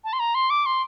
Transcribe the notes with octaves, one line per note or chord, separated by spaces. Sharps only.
A5
C6
A#5
C6
D6
C6